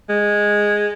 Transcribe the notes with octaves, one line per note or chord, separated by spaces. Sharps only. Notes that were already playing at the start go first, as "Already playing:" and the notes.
G#3